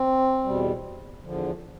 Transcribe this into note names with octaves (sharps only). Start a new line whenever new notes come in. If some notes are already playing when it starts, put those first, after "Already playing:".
Already playing: C4
E2 B2 G3
E2 D3 F3